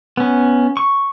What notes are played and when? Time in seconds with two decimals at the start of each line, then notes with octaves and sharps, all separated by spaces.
0.17 B3 C#4
0.77 C#6